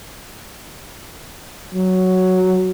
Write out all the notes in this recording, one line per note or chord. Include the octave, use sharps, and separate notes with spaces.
F#3